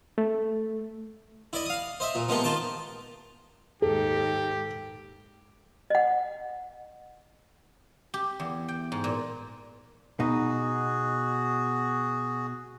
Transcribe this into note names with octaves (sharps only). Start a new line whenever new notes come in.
A3
E4 D5 D#5
F5 D#6
C5 D#5 E5
A#2
F3 G#3 A#3 B3 G4
D#3 F4 A5 D6
D#2 G#2 G4 A4
D#5 F#5
G4
E2
G5
G#2
A#2
B2 D#4 F#4 G#4